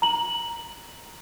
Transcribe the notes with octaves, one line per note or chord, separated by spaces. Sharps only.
A#5 F#7